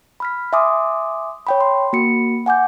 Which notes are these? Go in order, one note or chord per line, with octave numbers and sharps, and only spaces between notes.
B5 F6 B6
E5 G#5 C6 D6 D#6
C#5 G5 B5
C6
A#3 F#4 B5 C#7
F#5 G#5 D6 G6